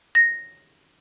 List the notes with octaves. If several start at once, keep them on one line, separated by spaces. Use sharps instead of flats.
A#6